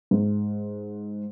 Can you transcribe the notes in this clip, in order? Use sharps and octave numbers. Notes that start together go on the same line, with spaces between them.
G#2